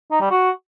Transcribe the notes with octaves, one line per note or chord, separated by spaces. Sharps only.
D#4
G3
F#4